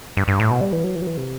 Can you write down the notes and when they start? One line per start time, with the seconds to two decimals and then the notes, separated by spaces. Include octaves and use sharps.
0.17 G2
0.28 G2
0.40 A2
0.51 B2
0.61 G3
0.73 E3
0.84 F#3
0.96 E3
1.02 F#3
1.07 E3
1.17 C3